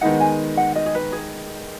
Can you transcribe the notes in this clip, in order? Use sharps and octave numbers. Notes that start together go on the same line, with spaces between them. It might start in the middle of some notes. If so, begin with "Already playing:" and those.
D#3 G#3 B3 D#4 F#5
G#5
F#5
D#5
G#4
B4
G#4